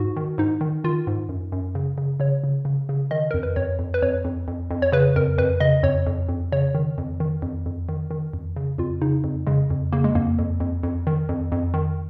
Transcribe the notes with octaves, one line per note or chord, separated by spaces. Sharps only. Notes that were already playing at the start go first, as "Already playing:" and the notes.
Already playing: G#2 F#4
D#3
G#2 D#4
D#3
D#3 F4
G#2
F#2
F#2
C#3
C#3
C#3 C#5
C#3
C#3
C#3
D#3 D#5
F2 A#4
B4
F2 C#5
F2
B4
F2 C#5
F2
F2
F2
C#5
C#3 B4
F2 A#4
F2 B4
C#3 D#5
F2 C#5
F2
F2
C#3 C#5
D#3
F2
D#3
F2
F2
D#3
D#3
F2
C#3
F2 F4
C#3 D#4
F2
C#3 G#3
F2
C#3 A#3
G#3
F2 A#3
F2
F2
F2
D#3
F2
F2
D#3